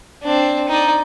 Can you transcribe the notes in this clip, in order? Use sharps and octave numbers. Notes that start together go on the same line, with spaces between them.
C4 D4
D#4 D5